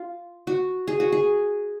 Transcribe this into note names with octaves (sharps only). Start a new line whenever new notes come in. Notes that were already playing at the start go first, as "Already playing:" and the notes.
Already playing: F4
F#4
G#4
F#4
G#4